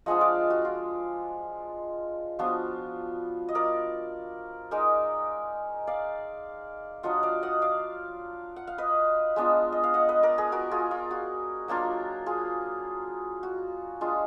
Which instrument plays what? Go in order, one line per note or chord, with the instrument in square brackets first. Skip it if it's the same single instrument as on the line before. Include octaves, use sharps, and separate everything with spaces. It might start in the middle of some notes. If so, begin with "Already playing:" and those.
[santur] F3 G#3 D4 F4 D#5 F#5
D5 F5
F#4
F4
F3 B3 D4 F4 F#4
D#5
A#4 D5
G#3 D#4 A#4 D5
D5 F5
F#3 D4 F4 D#5 F#5
D5 F5
D#5 F#5
D5 F5
F#5
F5
B4 D#5
G#3 B3 D4 F4
D#5
F5
D#5 F#5
B4 D#5
A#4 D5
G#4 B4
F#4 A#4
F4 G#4
F4
F#4
F#3 A#3 D4 F4
F4 G#4
F#4
G#3 D4 F4